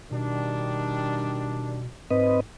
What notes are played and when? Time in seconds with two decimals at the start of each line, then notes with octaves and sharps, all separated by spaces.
0.11 B2 D#3 G3 D4
2.11 G#2 C4 B4 D#5